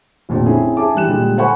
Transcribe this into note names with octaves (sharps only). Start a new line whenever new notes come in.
F1 F2 A#2 D3
C4 C#4 E4 G#4 A4
G#4 E5 A5 D6
E3 G3 F#6 E7
A#2 D3 G3 G#3
A4 C5 F#5 G#5 B5 C#6